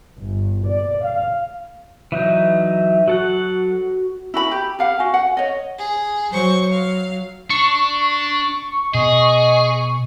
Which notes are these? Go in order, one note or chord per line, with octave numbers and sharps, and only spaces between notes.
G1
D5
F5
E3 F#3 D#4 E5
F#3 F#4 A4 F#5
E4 F#4 B5
G4
G4 F5 F#5
F#4 G#5
F#5
C#5 D#5
G#4
F#3 C5 C#6
F5
D4 C#6
B2 G#4 D#5